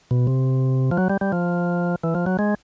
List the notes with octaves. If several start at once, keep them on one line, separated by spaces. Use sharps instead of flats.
B2
C3
F3
F#3
G3
G3
F3
E3
F3
F#3
G#3